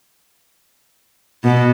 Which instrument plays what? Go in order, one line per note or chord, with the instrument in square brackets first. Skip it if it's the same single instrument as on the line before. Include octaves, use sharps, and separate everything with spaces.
[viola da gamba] B2